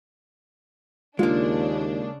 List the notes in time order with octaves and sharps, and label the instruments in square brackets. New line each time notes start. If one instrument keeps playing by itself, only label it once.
[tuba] D#2 [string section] C#3 D4 [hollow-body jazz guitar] G#3 A#3 [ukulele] F4